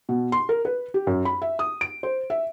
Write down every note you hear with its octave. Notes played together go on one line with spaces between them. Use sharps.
B2
C6
A#4
B4
G4
F#2
B5
E5
D#6
D7
C5
E5